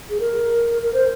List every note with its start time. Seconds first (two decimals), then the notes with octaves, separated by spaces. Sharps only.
0.10 G#4
0.20 A#4
0.82 A#4
0.93 C5